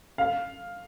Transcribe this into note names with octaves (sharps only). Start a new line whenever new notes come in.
F5